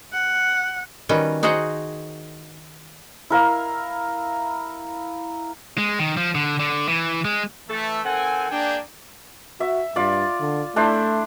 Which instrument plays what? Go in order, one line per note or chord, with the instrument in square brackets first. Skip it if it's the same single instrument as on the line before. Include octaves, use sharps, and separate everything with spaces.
[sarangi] F#5
[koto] D#3 G3 C#4 F#4 B4
D#4 F#4 G#4 C5 F#5
[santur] E4 A#4 F5
[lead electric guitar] G#3
D#3
F3
D3
D3
E3
G#3
[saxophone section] E3 A4 [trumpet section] A3
[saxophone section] D#3 A4 F#5 [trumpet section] C4 G#5
[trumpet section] A#3 G#4 G5 [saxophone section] D4
[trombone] F#4 [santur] E5
[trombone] G2 [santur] F4 D5
[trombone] D3
[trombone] A3 [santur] D4 E4 C5